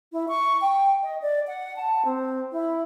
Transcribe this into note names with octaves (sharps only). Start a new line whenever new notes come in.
E4
C#6
G5
D#5
D5
F#5
A5
C4
E4